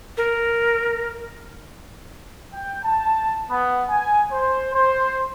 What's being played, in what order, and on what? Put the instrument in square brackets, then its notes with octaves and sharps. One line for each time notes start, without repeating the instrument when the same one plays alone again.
[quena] A#4
[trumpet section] G5
A5
B3
G#5
C5
C5